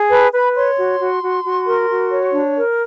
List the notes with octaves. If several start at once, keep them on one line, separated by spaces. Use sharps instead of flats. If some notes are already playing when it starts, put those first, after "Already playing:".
Already playing: G#4
B4 A5
B4 B5
C#5 C6
F#4
F#4
F#4
F#4
A#4
F#4
C#5
D4
A#4